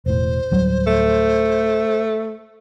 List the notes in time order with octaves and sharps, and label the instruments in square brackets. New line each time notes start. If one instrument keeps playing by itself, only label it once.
[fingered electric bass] E1 A2 [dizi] C5
[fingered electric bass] D1 F#3 G3
[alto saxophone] A3